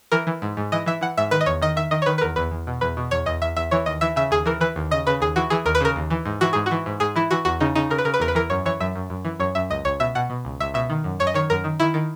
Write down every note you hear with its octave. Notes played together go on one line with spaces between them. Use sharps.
E3 A#4
E3
G#2
G#2
E3 D#5
E3 E5
E3 F#5
G#2 E5
D#3 B4
D#5
E2 C#5
D#3 D#5
D#3 E5
D#3 D#5
C#5
D#3 B4
B4
E2 A#4
E2 B4
E2
B2
E2 B4
B2
E2 C#5
E2 D#5
E2 E5
E2 E5
E3 C#5
D#2 D#5
E3 E5
C#3 E5
D#2 G#4
E3 A#4
E3 B4
D#2
C#3 D#5
C#3 B4
D#2 G#4
E3 F#4
E3 G#4
D#2 A#4
B4
C#3 A#4
D#2
E3
G#2
E3 F#4
G#2 G#4
F#4
E3
G#2
G#2 G#4
E3 E4
E3 F#4
E2 F#4
C#3 D#4
C#3 D#4
C#3 A#4
B4
C#3 A#4
B4
E2 A#4
B4
E3 A#4
F#2 C#5
E3 C#5
F#2 E5
F#2
F#2
E3
F#2 C#5
F#2 E5
C#2 D#5
C#2 C#5
B2 E5
B2 F#5
B2
C#2
C#2 E5
B2 E5
D#3
F#2
F#2 C#5
D#5
D#3 C#5
F#2 A#4
D#3
D#3 E4
D#3